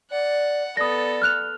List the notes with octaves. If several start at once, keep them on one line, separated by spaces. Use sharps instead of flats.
D5 F#5
B3 A4 D5 D#6 A#6
F6 F#6 F7